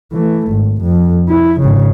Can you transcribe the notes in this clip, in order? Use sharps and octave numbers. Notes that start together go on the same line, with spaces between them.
E3 A3
G#1
F2
E4
G#1 C#3